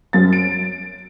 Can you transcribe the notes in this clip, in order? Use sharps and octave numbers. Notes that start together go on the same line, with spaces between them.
F#2 A6
D7